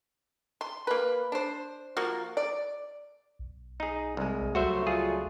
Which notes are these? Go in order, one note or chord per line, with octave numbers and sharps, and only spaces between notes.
C6
A#3 B4
D4 C5
F3 A#3 F#4
D5
B1
D#4 G#4
C2 G#3
C#2 F#3 G3 A3 F#4 C5 E5
F4 G#4